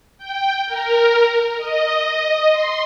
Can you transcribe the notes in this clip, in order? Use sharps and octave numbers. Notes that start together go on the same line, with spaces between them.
G5
A#4
D#5
C6